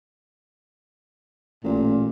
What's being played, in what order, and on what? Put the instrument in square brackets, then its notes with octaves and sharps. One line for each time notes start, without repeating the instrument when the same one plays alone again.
[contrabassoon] A1 [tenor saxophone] A#2